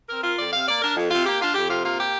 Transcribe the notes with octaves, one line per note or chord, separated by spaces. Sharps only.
C4 A#4
F4 A#4
F2 D5
C3 F5
A#3 D5
D4 A#4
F2
C3 F4
A#3 G4
D4 F4
F2 G4
C3 F4
A#3 F4
G4